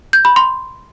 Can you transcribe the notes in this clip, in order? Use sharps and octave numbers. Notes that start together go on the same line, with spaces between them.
G6
B5
C6